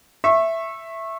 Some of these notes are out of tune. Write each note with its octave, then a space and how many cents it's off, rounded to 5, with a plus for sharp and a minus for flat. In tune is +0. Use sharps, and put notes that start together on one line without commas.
E5 +0 C#6 -25